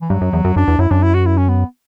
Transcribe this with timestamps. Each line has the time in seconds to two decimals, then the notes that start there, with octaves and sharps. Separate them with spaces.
0.01 E3
0.10 G2 F#3
0.21 F#2
0.33 E2
0.45 F#2
0.56 F#2 D4
0.68 E2
0.79 F#2 E4
0.90 F#2 D4
1.02 E4
1.14 F#4
1.26 E4
1.38 C#4
1.49 B3